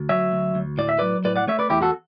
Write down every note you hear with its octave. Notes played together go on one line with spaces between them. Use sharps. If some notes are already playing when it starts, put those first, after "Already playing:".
Already playing: D2
F#3 C#5 E5
D2
D2
A2 D5
E5
F#3 B4 D5
A2 B4 D5
D5 F#5
A3 C#5 E5
B4 D5
E2 E4 G4
F#4 A4